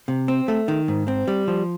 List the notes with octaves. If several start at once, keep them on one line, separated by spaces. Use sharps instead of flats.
C3
C4
A3
D#3
G#2
C4
G3
F3